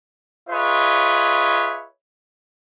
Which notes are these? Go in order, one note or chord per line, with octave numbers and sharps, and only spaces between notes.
F4 G#4 B4 C#5 D#5 E5